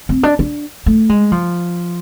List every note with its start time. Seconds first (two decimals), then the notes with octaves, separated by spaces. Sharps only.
0.09 C4
0.23 D4
0.39 D4
0.86 A3
1.09 G#3
1.32 F3